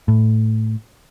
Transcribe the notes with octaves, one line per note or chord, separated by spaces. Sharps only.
A2